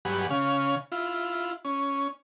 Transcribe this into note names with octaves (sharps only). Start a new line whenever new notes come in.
G2 F#3 G3 G#4 B4 F#5
C#3 C#4 F5
E4 F4
C#4